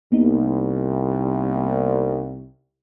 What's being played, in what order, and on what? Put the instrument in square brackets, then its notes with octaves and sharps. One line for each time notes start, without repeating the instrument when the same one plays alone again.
[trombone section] C2 [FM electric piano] A#3 B3 D#4